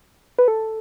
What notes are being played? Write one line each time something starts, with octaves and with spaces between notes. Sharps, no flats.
B4
A4